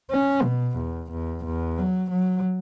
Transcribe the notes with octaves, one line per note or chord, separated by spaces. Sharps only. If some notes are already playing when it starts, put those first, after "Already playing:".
C#4
B2
E2
E2
E2
F#3
F#3